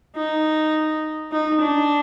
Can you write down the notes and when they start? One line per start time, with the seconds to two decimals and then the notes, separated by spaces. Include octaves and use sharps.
0.16 D#4
1.32 D#4
1.61 D4